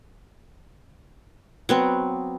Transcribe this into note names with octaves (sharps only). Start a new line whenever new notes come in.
F#3 B3 C4